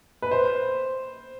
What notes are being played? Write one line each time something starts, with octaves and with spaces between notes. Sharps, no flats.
B4
C5